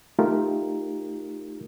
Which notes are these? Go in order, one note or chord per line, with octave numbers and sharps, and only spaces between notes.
A3 D#4 F4 G4 A#4